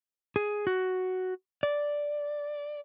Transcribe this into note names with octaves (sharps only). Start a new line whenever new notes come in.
G#4
F#4
D5